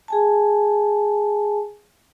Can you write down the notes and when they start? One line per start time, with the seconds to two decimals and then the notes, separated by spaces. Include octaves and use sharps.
0.08 G#4 G#5 A5